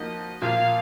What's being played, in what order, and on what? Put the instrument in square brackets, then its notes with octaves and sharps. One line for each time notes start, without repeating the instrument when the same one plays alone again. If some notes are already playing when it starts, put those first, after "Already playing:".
Already playing: [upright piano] F3 A#3 D#4 F#4 [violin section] D#5
[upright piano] A#2 F3 A#3 F4 [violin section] F5